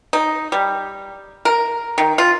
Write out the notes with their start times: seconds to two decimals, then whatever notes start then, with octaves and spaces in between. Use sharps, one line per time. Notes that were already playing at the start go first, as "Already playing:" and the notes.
0.13 D#4
0.52 G3
1.45 A#4
1.98 D#3
2.18 F4